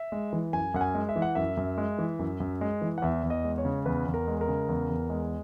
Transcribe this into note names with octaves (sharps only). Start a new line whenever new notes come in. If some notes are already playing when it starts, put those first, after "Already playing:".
Already playing: E5
G#3
E3
F#2 G#5
F#2 F#5
G#5
G#3
E5
E3
F#5
F#2 E5
F#2
G#3
E3
F#2
F#2
G#3
E3
F#5
E2 E5
E2
D#5
G#3
C#5
C#3
E2 B4
E2
A#4
G#3
A#4
C#3
E2
E2
G#3